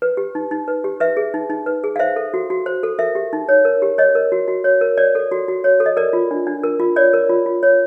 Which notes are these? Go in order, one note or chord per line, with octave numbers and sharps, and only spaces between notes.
B4
G4
D#4
D#4
B4
G4
B4 E5
G#4
D#4
D#4
B4
G#4
F5
C5 E5
A4
F#4
F#4
C5
A4
A#4 E5
G4
D#4
C#5
A#4
G4
C#5 D#5
A#4
F#4
F#4
C#5
A#4
C#5 D5
A4
F#4
F#4
C#5
A4
D#5
A#4 D5
F4
D4
D4
A#4
F4
C#5 D5
A#4
F4
F4
C#5